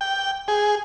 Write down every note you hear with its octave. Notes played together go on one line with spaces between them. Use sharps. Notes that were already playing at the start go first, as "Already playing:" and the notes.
G5
G#4